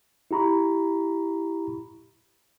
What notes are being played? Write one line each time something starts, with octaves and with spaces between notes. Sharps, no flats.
E4 G4 A#5 B5 C#6